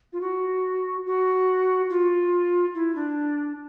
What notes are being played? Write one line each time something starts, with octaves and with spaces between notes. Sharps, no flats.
F4
F#4
F#4
F4
E4
D4